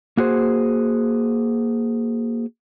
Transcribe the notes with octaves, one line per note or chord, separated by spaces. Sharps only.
A#3 F#4 G#4 C5